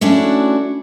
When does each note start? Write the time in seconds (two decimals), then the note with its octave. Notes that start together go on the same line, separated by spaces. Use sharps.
0.01 A3 C#4 D4 E4 F#4